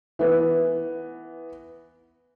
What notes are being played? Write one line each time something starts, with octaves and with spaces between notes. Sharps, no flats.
E3 B3